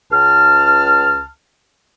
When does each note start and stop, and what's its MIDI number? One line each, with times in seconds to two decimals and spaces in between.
0.12 1.27 37
0.12 1.27 81
0.12 1.27 89